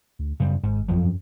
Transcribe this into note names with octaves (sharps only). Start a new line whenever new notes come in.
D2
F#2 C#3 G3
G#1 G#2
F2 F3 F#3
F#2